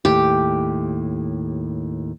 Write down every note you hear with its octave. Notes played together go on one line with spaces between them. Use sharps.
D#2 A2 G4